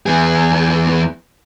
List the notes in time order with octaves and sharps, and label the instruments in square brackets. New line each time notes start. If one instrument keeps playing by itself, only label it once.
[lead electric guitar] E2 G#4